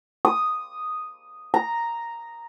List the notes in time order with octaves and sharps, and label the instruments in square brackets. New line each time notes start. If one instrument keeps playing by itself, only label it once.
[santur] D#6
A#5